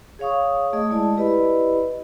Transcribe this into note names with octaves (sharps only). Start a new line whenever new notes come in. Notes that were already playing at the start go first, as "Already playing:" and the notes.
G#4 C#5 F5 C#6 D#6
A3 G#4 D#5 D#6
G#3 E4 D5 A5
E4 G4 B4 D5 D#5 B5